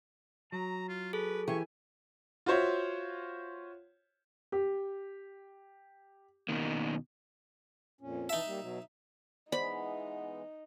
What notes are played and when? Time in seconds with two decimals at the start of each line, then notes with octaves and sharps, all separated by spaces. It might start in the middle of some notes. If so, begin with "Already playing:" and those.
0.52 F#3 A#5
0.89 F4
1.13 G#4 A4 B4
1.48 E3 G4 G#5 C#6
2.46 F4 F#4 C5 C#5 E5
4.52 G4
6.49 B2 D#3 A#3
8.01 F2 A#2 C#4
8.29 E3 D#4 E5 A5
8.46 G3 A#3
8.60 B2 F#3
9.52 E3 G#3 B3 D#4 C5 D5 B5